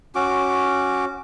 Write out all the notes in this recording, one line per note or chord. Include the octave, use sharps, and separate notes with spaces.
C#4 F#4 D6